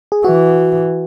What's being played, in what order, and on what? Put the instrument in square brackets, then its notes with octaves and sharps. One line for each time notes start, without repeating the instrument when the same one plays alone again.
[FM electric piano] G#4
[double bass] E3 [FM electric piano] F#4